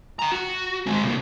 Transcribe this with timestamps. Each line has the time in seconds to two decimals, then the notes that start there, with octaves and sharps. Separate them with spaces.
0.19 G5 A#5
0.32 F#4
0.86 G#3 C4
1.03 C2 A#3